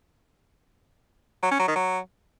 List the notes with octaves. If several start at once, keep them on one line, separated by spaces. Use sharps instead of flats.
F#3
C#4
F#3
D#3
F#3